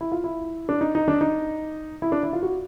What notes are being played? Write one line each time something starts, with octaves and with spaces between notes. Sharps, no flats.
E4
F4
E4
D4
D#4
D#4
D4
D#4
E4
D4
E4
F4
F#4